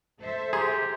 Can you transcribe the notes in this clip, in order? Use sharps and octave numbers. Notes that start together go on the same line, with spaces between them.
A4 C5 E5
G4 G#4 A#5 C6